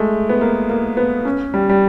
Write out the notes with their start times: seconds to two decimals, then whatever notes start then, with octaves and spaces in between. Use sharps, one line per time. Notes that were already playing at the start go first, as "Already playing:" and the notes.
Already playing: G#3 A3
0.29 B3
0.41 A#3
0.70 A#3
0.97 B3
1.25 C#4
1.54 G3
1.69 G3